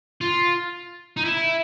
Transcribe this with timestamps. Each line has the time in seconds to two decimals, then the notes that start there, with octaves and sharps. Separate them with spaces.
0.21 F4
1.17 D#4
1.25 E4